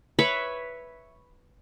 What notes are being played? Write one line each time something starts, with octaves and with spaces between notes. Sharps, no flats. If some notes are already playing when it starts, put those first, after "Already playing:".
B4 C#5 E5